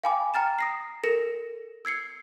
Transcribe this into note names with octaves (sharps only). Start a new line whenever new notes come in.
F5 G5 G#5 B5 D6
G5 A#5 F6 A6 E7
D#6 A#6 C7
A4 A#4 A#6 C#7 E7
E6 G#6 C7 C#7